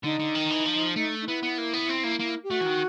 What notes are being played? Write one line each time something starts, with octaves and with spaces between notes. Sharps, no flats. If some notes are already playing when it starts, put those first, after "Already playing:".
D3 D#4
D3
D#3
E3
F3
A3
D#4
B3 E4
B3
A#3
B3
C4
A#3
A#3
G4
A3 F#4
E3
D#3